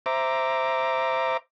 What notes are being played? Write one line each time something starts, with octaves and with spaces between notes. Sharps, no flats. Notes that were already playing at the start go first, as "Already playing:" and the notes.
C5 E5 A#5 D6